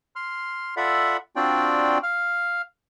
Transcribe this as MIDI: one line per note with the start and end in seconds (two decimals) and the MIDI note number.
0.16 0.75 84
0.16 0.75 89
0.77 1.17 65
0.77 1.17 69
0.77 1.17 74
0.77 1.17 76
0.77 1.17 78
0.77 1.17 83
1.36 1.98 60
1.36 1.98 62
1.36 1.98 65
1.36 1.98 66
1.36 1.98 74
1.36 1.98 79
2.03 2.62 77
2.03 2.62 89